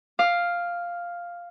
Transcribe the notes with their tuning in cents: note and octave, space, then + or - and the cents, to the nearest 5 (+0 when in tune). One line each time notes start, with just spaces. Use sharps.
F5 +0 D6 +35